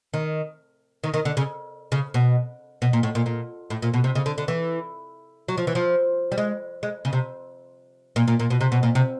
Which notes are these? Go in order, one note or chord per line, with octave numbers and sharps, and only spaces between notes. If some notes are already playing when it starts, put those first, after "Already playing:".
D#3
D#3
D#3
D3
C#3
C#3
B2
B2
A#2
A2
A#2
A#2
A2
A#2
B2
C3
C#3
D3
D3
E3
F#3
F3
E3
F3
G3
G#3
G#3
C#3
C3
A#2
A#2
A#2
B2
C3
B2
A#2
C3